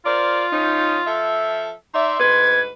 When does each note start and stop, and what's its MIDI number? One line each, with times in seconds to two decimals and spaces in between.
0.05 1.44 65
0.05 0.46 70
0.05 0.46 72
0.05 0.46 74
0.53 0.99 53
0.53 0.99 61
0.53 0.99 63
1.06 1.73 53
1.06 1.73 69
1.06 1.73 76
1.94 2.19 63
1.94 2.19 74
1.94 2.19 76
1.94 2.54 84
2.20 2.71 38
2.20 2.71 44
2.20 2.71 71
2.20 2.61 92